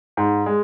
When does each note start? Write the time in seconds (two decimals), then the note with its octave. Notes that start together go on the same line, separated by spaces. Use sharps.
0.17 G#2
0.46 G#3